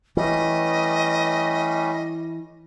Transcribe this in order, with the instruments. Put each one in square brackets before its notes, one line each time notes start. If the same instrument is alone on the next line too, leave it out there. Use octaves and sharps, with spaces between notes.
[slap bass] E3 [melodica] G3 A3 C#4 [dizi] D#5